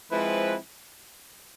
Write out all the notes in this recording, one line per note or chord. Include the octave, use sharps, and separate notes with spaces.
F3 G#3 C4 E4 B4